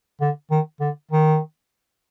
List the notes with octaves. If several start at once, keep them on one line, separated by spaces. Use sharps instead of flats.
D3
D#3
D3
D#3